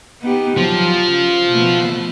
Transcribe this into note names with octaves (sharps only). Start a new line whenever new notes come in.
B3 D#4 G4
F3 F#3
C#3
B2 A3 B3